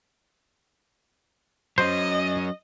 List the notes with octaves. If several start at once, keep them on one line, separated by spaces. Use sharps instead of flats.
F#3 C#4 C5 D#5